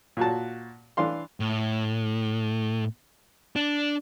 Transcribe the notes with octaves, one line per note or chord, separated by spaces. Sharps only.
A#2 F#4 A5
E3 D4 F5 C6
A2
D4